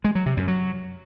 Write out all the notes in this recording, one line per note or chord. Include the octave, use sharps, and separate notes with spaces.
G#3
F#3
C3
F#2
F#3